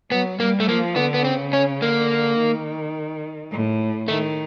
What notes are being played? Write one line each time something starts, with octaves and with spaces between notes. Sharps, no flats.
F#3 B3
G3 A#3
A3
F3 A#3
D3 B3
B3
C#3 C4
C#4
D3 A#3
D#3
A2
D#3 A3